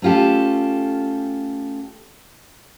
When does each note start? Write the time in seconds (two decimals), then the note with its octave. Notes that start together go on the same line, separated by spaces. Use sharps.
0.02 A3 C#4 F4 G4 A4